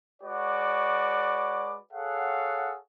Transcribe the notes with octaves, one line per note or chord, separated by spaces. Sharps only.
G#3 F#4 B4 C#5 D5 D6
G#4 A4 C#5 F5 F#5